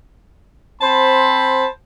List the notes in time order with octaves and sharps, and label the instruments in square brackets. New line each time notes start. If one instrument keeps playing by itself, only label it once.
[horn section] C4 C5 A5 B5